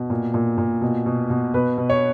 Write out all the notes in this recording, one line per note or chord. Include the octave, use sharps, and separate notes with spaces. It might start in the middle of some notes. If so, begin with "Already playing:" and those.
Already playing: B2
A#2
A#2
A#2
B2
B2
B2
B2 B4
B2
C#5